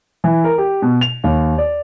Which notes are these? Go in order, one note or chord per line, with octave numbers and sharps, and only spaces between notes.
E3
A#4
G4
B2
F7
D#2
D5